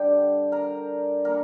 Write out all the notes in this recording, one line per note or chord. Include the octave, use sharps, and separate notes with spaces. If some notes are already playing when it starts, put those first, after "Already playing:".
Already playing: D3 G3 D4 G4 G5
A#4 A#5
A#2 G3 D4 A#4 A#5